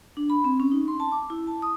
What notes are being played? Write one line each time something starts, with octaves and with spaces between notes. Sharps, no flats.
D4
B5
C4
C#4
D#4
C6
A5
D6
E4
A5
D#6